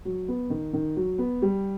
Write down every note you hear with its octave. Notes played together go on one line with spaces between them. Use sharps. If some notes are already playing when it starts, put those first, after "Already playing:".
F#3
B3
D#3
D#3
F#3
B3
G3